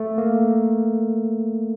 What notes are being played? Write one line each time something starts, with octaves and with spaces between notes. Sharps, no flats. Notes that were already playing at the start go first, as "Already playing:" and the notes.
Already playing: A3
A#3